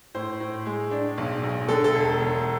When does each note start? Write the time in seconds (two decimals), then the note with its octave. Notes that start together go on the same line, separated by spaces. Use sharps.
0.15 A2 C5
0.40 A2
0.66 G#3
0.91 D4
1.18 B1
1.43 B1
1.68 D3 A4
1.84 A4
1.94 E1
2.20 E1